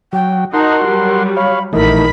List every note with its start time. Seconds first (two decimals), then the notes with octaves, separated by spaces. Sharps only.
0.13 F#3 G5
0.54 D#4 F#4 A#4 F#5 A5 C6
0.85 F#3 G3
1.36 C#5 F5 B5
1.73 A#1 E3 A3 D#4 A#4 B5